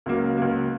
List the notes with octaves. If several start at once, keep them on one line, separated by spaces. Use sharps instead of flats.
C#2 C#3 F#3 A#3
C#2 C#3 F#3 A#3